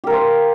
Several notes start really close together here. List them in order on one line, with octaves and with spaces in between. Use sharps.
G4 A#4 F5 C5